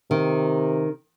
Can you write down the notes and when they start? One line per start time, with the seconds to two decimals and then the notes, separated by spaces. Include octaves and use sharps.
0.11 C3 D#3